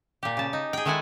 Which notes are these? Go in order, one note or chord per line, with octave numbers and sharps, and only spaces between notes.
A#2 G4
C#3 A5
D#4
G#4 G5
D#3 G#3 E4 A4 F#5 G#5